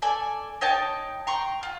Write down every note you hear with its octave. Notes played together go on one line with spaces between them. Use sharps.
A4 D5 G#5
D#4 C#5 G5 A5
G5 A#5 C6 C#6
F4